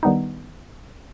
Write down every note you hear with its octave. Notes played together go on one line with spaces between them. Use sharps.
D#3 G3 B3 D4 D#4